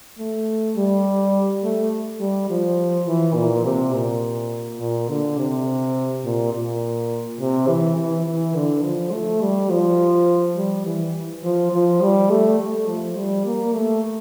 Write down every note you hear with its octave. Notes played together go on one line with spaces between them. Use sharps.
A3
G3
A3
G3
F3
E3
A#2
C3
A#2
A#2
D3
C3
A#2
A#2
C3
E3
E3
E3
D3
F3
A3
G3
F3
G3
E3
F3
F3
G3
A3
A3
F3
G3
A#3
A3